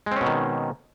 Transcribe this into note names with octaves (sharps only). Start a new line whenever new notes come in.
B2 D#3 G#3 C4 C#4